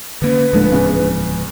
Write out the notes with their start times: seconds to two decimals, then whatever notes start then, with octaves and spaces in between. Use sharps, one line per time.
0.22 D3 A#3 C#4 B4
0.53 D1 A#2 D3 F3 G#3 A3
0.72 E2 C#3